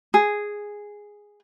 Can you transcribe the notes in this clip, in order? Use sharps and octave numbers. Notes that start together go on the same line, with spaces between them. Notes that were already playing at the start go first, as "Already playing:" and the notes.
G#4